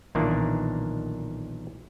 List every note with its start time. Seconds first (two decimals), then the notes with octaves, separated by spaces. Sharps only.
0.15 B1 A#2 D#3 E3 A#3 D4